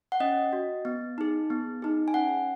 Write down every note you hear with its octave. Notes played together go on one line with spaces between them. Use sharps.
F#5
C#4 D#5
F#4
B3
D#4 G#4
B3
D#4 G#4
G#5
C#4 F#5